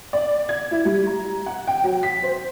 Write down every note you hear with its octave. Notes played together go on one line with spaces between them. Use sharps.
D5
G#6
E4
G3
A#5
F#5
G5
F#3
B6
C5